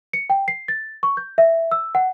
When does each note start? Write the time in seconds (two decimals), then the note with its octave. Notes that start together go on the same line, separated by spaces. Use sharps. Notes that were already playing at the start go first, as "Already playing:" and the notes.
0.13 C#7
0.30 G5
0.48 C7
0.68 A6
1.03 C#6
1.17 G6
1.38 E5
1.71 E6
1.95 F#5